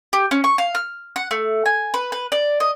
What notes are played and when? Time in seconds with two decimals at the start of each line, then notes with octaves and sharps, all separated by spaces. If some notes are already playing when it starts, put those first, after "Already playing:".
0.13 G4
0.31 C#4
0.44 C#6
0.58 F5
0.75 F6
1.16 F#5
1.31 A3
1.66 G#5
1.94 B4
2.12 B4
2.32 D5
2.60 D#5